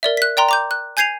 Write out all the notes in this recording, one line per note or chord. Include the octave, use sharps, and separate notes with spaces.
A#4 D5 E5
F#6 B6
D5 G5 A#5 C6
A#5 D6 G6
F#6
G#5 G6 G#6 C7 D#7 F7